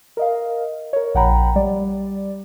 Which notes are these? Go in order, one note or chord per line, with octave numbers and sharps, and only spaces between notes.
A#4 D#5 F5
A#4 C#5
A#1 F#5 G5 A#5 B5
G3 D5